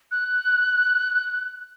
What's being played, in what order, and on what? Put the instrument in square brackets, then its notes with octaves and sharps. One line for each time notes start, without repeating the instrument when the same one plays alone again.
[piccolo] F#6